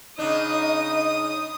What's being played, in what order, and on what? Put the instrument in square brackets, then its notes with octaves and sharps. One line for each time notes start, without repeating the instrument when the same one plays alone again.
[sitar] C#3 D4 [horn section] D#4 [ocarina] D#5 [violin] D#6